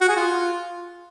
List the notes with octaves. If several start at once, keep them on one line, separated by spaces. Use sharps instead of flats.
F#4
G#4
F4